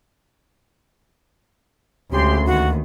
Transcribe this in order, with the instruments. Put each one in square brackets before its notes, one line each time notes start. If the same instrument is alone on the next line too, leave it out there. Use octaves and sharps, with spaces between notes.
[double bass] D2 [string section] C#3 G#3 C6 [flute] G4
[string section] D#2 D#3 [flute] F#4